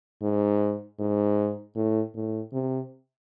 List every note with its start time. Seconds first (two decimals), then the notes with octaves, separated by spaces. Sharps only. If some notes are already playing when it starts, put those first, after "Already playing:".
0.22 G#2
0.99 G#2
1.75 A2
2.14 A2
2.53 C3